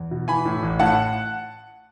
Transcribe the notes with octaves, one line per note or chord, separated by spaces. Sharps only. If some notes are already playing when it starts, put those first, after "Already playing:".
Already playing: E2
B2
E3 G#5 B5
A2
A1
A2 F#5 A5